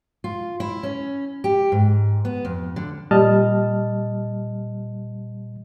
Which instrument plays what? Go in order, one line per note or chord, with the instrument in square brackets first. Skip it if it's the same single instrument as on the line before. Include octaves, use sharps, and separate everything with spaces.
[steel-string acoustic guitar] F4
E4
C#4
G4
G#2
B3
F2
D3
[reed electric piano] A#2 G3 D#5 A5 F6